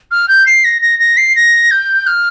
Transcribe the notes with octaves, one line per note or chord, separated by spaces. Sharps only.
F6
G6
C7
A#6
A#6
A#6
C7
A#6
G6
F6